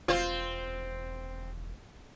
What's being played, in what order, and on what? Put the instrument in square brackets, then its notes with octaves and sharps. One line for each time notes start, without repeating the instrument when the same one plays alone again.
[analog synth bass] E1 [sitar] C4 C5 [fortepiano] F4